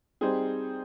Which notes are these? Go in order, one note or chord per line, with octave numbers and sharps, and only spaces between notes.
G3 C4 D#4 G#4 C5